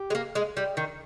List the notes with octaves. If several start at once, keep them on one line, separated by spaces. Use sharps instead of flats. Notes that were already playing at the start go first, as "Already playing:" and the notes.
Already playing: G4
G#3
A#3
G#3
G3
D#3